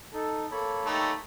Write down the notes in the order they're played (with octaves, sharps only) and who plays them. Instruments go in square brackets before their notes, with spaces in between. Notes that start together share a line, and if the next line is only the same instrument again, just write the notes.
[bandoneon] D#4 [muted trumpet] A4
[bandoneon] A#3 C#5 B5 [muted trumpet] A4
[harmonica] A3 D#4 G4